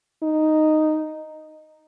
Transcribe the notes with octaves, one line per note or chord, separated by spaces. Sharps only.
D#4